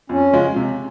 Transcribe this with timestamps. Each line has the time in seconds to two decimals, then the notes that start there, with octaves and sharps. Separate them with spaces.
0.09 F2 C#4
0.33 C#3 F3 G#3
0.56 C3